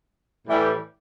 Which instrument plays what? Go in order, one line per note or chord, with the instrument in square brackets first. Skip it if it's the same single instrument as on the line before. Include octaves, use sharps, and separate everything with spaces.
[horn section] A2 E3 G3